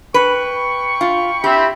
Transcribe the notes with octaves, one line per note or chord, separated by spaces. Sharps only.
B4 G5 B5 C#6
F4
C4 G4 E5 B5